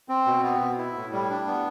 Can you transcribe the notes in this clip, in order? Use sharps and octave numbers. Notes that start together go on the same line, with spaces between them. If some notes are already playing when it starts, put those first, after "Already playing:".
C4
B2
B3
B2
E4
A2
G3
D4
B3